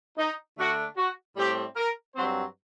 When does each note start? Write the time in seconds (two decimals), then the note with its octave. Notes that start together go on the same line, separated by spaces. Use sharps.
0.18 D#4
0.57 D3 A3 D4 F#4
0.96 F#4
1.36 A2 G3 C4 G4
1.76 A#4
2.15 G2 F#3 C4 C5